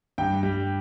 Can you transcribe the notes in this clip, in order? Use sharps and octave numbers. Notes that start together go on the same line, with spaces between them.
G2 G5
G3